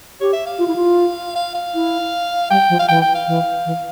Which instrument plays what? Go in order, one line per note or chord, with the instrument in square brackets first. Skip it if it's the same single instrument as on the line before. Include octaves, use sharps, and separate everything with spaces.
[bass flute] G4 [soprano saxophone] C#5
[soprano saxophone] E5
F5
[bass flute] F4
E4
F4
[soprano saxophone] F5
F5
[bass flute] E4
[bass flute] G3 [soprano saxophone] G5
[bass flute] F3
[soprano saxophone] F5
[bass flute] E3 [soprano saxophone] G5
[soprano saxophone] G5
F5
[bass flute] E3
E3